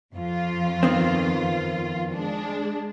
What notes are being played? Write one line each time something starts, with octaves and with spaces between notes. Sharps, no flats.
F2 F4
D#3 B3 C4
G#3 D4